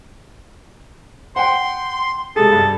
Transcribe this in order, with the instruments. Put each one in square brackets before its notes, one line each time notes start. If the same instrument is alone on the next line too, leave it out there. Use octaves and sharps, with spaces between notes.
[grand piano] F#5 G5 [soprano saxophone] C6
[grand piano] C3 G#3 G#4 [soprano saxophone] A4
[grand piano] G2